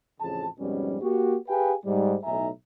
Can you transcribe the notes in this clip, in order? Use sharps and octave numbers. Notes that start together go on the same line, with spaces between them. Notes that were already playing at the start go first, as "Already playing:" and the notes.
A1 F2 C#3 G#4 A5
F2 G#2 B2 G3 C#4
A#3 F#4 G4
G4 G#4 B4 F5 G5 G#5
G#2 G3
B1 A2 D#4 E5 G#5 A#5